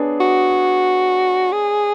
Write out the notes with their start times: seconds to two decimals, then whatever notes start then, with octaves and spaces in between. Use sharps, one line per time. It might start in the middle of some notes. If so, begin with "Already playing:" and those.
Already playing: B3 D4 G#4 C#5
0.20 F#4
1.52 G#4